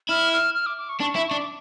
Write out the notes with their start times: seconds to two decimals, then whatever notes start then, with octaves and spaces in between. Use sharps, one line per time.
0.09 E4 F6
0.33 F6
0.54 F6
0.66 D6
0.78 D6
0.89 C#6
1.01 D4 C#6
1.16 E4
1.28 D4 C#6
1.38 D6